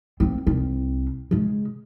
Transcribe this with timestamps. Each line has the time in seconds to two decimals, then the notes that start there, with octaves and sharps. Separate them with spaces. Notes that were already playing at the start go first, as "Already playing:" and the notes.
0.20 A#3 C4
0.47 C2 C4
1.31 C#3 G#3